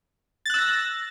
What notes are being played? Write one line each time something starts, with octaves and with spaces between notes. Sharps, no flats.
E6 F#6 A6 A#6